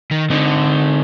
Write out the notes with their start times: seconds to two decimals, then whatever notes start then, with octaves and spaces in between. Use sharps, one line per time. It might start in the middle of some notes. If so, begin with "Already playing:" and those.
0.11 D#3
0.30 D3 C4 D#4